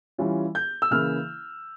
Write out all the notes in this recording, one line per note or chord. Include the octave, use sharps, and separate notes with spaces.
E3 G3 C#4 F4
G6
E6
C#3 E3 A#3 E4 F6